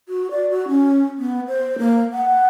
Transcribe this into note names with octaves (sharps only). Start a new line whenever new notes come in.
F#4
D5
F#4
C#4
B3
C5
A#3
F#5